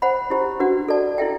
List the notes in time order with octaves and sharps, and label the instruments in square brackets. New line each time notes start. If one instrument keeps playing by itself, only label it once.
[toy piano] C5 F#5 B5
E4 G4 C5
D4 F#4 B4 F#5
A4 D5 A5
E4 A4 E5 G5